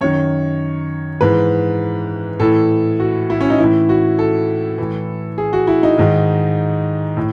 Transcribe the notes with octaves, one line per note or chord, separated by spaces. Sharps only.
F#2 D#3 C#5
G#2 E3 B4
A2 E3 A4
F#4
E4
C#4
D#4
A2 E3 E4
F#4
A4
A2 E3
G#4
F#4
E4
D#4
G#2 D#3
A2